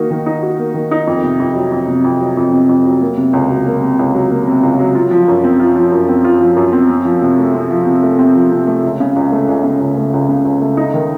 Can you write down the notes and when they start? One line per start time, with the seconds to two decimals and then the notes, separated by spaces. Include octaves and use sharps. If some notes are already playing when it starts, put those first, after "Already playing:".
Already playing: D#3 A#3 D#4 F#4
0.10 D#3
0.26 D#4
0.43 F#4
0.59 A#3
0.74 D#3
0.91 D#4
1.07 F2
1.24 C3
1.40 F2
1.56 F#3
1.72 F2
1.88 C3
2.04 F2
2.20 F#3
2.37 F2
2.53 C3
2.69 F2
2.85 F#3
3.01 A#3
3.17 C3
3.33 C#2
3.50 F#3
3.66 A#3
3.82 C3
3.99 C#2
4.14 F#3
4.31 A#3
4.47 C3
4.63 C#2
4.79 F#3
4.95 F4
5.11 F3
5.28 F#2
5.44 C4
5.60 F4
5.76 F3
5.92 F#2
6.09 C4
6.25 F4
6.41 F3
6.56 F#2
6.73 C4
6.89 C4
7.05 F3
7.22 C3
7.38 A3
7.54 C4
7.71 F3
7.86 C3
8.03 A3
8.19 C4
8.35 F3
8.52 C3
8.67 A3
8.83 C#2
9.00 C#3
9.16 C#2
9.32 A3
9.48 C#2
9.64 C#3
9.81 C#2
9.97 A3
10.13 C#2
10.29 C#3
10.45 C#2
10.62 A3
10.77 D#4
10.94 D#3